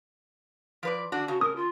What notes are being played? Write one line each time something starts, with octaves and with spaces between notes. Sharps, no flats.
F3 B4 D5
D3 D4 F#4
C#3 F#4
A#4 D#6
F4